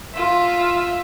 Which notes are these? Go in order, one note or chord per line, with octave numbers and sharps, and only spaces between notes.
F4 E5